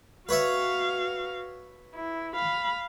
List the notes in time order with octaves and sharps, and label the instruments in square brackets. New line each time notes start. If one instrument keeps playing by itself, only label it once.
[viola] F#4 F5 [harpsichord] B4 C#5 E5
[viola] E4
F5 B5